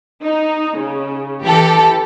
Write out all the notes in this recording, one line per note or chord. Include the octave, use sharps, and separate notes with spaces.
D#4
C#3
E3 G4 A4